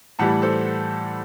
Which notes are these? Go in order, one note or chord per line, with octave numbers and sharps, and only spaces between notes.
A2 E3 G3 F#5 A5
A4 C5